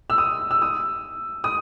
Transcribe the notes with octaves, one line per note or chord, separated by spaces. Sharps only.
E6
D#6
E6
D#6
D#6